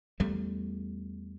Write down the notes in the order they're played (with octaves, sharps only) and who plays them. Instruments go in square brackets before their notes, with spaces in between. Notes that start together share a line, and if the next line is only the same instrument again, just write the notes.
[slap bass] E2 G3 A3